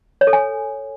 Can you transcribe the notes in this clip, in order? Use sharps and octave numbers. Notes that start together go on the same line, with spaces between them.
C#5
A4
G#5